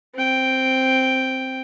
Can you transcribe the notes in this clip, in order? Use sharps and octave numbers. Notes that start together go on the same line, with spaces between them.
C4 G5